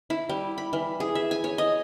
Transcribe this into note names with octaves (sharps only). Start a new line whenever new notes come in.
E4
G3
B5
E3
G#4
E5
G#5
C#5
D#5